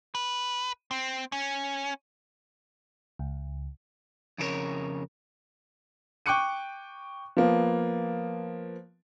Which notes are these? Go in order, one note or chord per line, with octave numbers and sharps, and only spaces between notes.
B4
C4
C#4
C#2
F2 C#3 C#4 A#4 C#5
G5 C#6 D6 F#6 C#7 D#7
F3 A#3 B3